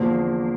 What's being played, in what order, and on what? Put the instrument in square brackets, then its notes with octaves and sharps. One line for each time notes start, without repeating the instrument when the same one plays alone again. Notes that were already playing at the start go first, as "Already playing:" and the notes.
Already playing: [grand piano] E2 D3 F3 C4 [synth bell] A#3